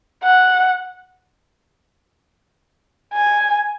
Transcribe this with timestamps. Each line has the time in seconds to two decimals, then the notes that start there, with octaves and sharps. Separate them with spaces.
0.24 F#5
3.14 G#5